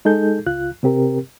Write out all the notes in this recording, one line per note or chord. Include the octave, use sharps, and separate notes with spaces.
G#3 D#4 G#4 A4 G6
C#2 F4 F#6
C3 C4 G4 A#4